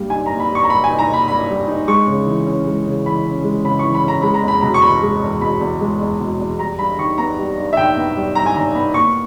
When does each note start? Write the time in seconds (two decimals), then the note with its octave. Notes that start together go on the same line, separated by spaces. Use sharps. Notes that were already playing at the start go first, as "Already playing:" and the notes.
Already playing: G2 G3 A#3
0.10 D#4 G#5
0.26 A#3 A#5
0.40 B5
0.51 G2 C#6
0.64 A#5
0.70 G3 B5
0.84 G#5
0.89 D#4
0.99 A#5
1.08 A#3
1.13 B5
1.28 G2 B5
1.49 G3
1.67 D#4
1.88 G#3 C#6
2.07 C#3
2.26 E3
2.47 C#4
2.66 G#3
2.86 C#3
3.05 E3 B5
3.26 C#4
3.44 G#3
3.64 C#3 B5
3.79 E3 C#6
3.94 B5
4.04 C#4 A#5
4.22 G#3 B5
4.34 A#5
4.43 E2 B5
4.61 B2 A#5
4.74 C#6
4.82 E2 B5
5.03 G#3
5.22 E2
5.41 B2 B5
5.61 E2
5.81 G#3
6.01 E2
6.20 B2
6.40 E2
6.59 G3 A#5
6.79 G2 B5
6.98 D#3 C#6
7.18 B3 A#5
7.38 G3
7.57 G2
7.73 E5
7.77 D#3 G5
7.97 B3
8.16 G3
8.35 G2 A#5
8.46 G#5
8.56 D#3 A#5
8.75 B3 B5
8.94 A#3 C#6